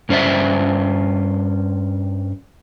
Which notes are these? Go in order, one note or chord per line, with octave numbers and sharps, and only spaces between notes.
G2 C#4 C5 D5 E5